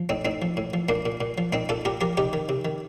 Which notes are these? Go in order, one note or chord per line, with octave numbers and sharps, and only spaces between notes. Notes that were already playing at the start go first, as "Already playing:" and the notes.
Already playing: F3
A2 C4 D#4
A2 C4 D#4
F3
A2
F3
A#2 A#3 D4
A#2
A#2
F3
A#2 C4 D#4
A#2 F4 A4
A#2 G4 A#4
F3 G4 A#4
C3 D#4 G4
D#3
C3
D#3